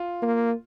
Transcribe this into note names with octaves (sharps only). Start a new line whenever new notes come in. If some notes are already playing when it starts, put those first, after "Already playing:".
Already playing: F4
A#3